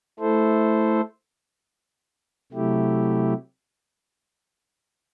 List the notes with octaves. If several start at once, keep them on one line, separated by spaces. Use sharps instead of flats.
A3 E4 A4 C5
C3 F#3 A3 E4 G4